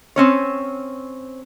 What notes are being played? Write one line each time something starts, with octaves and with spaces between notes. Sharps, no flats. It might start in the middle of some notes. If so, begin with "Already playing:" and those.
C4 C#4 C#5